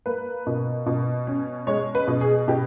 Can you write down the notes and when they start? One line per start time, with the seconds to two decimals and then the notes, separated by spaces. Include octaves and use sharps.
0.06 A#3 B4
0.47 B2
0.86 B2
1.27 C#4
1.67 G#3 C#5
1.95 B4
2.07 B2
2.21 G#4
2.48 B2 G4